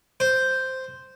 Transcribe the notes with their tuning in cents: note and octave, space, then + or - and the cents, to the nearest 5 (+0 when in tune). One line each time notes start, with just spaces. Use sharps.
C5 -5